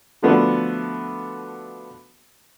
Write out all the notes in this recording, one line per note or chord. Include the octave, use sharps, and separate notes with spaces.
D3 F3 A3 B3 D4 F#4